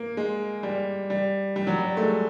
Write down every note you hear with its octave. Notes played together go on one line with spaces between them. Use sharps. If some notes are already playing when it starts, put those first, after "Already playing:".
Already playing: A#3
G#3
G3
G3
G3
F#3
G3
A3
G#3